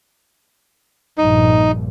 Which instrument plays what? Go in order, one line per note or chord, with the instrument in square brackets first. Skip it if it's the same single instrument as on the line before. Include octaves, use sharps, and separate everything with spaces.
[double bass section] A#1 G2 [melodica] D#4